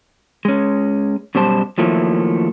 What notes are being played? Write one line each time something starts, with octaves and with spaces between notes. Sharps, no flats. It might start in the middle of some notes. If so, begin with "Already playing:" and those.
G#3 C#4
F#2 B2 G3 C5 A5
D#3 F3 F#3 A3 A#3 E4